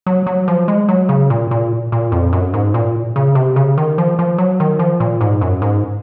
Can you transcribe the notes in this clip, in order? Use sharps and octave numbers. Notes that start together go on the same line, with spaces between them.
F#3
F#3
F3
G#3
F#3
C#3
A#2
A#2
A#2
F2
F#2
G#2
A#2
C#3
C3
C#3
D#3
F3
F3
F#3
D#3
F3
A#2
G#2
F#2
G#2